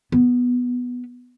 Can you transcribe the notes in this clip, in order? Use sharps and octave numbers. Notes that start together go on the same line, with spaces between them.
B3